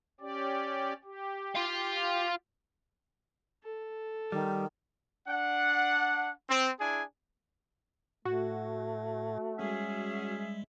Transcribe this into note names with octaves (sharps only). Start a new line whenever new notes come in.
C#4 G4 D5
G4
F4 F5
A4
D#3 G3
D4 F#5
C4
D4 E4 G#4 G#5
A2 A3 F#4
G3 G#3 C#4 G#4 E5